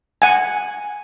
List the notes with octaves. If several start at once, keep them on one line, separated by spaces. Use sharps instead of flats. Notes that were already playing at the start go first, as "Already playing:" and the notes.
F#5 G#5